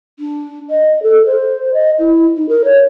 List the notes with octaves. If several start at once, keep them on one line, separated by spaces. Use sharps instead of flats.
D4
D#5
A4
C5
D#5
E4
D#4
A#4
C#5